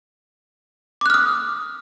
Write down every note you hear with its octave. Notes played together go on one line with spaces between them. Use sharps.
D6 D#6 F6 F#6